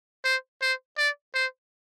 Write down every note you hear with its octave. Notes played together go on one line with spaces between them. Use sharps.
C5
C5
D5
C5